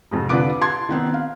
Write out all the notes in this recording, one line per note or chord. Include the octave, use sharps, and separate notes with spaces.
F2 G#2 C3
D3 F4 B4 D6 D7
A5 C6 G#6
D#3 B3 C4
F5